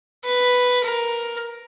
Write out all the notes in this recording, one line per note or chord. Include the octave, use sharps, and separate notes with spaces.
B4
A#4